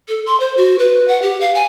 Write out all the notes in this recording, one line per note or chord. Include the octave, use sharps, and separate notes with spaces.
A4
C6
C5
F#4
B4
F#5
G4
F5
G#5